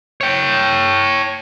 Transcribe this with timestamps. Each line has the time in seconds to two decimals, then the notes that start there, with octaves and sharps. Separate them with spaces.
0.21 C#5 G5